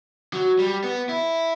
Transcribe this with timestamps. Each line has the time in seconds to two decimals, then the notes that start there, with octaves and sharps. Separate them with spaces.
0.33 F#3
0.59 G3
0.84 B3
1.09 E4